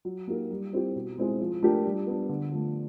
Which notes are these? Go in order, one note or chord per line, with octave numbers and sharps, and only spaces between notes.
F#3
A#3 D#4 G4 A#4
G3
C4 E4 G4
B2
G#3 C4 E4 G#4
F3
A3 D4 G4 A#4
G3
B3 D4
D3
F3 A3